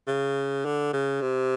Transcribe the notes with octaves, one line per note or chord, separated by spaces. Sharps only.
C#3
D3
C#3
C3